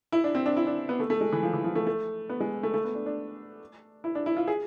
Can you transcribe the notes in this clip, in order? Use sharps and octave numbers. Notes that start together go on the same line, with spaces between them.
E4
D4
C4
D4
E4
D4
B3
A3
A3
G#3
E3
F3
E3
F3
A3
A3
B3
G#3
A3
A3
B3
D4
D4
E4
D4
E4
F4
G#4